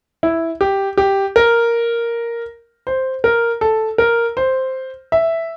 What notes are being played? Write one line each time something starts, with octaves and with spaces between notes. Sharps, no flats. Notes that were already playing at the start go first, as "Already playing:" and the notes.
E4
G4
G4
A#4
C5
A#4
A4
A#4
C5
E5